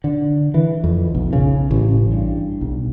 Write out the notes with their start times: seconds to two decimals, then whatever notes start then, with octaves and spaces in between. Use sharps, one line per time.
0.04 D3
0.54 E3
0.84 F2
1.15 B1
1.33 C#3
1.71 A1
2.12 G2
2.61 B1